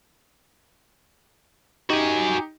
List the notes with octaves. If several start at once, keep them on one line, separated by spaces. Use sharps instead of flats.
D#4 F#4 G4 G#5